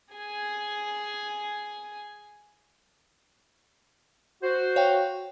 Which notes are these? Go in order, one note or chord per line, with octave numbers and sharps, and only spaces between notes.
G#4 G#5
F#4 C5
C#5 F5 G5